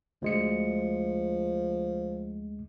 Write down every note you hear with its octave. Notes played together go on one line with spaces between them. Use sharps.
D2 F3 G#3 C#7